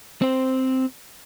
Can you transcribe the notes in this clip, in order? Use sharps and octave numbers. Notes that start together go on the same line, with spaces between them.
C4 C5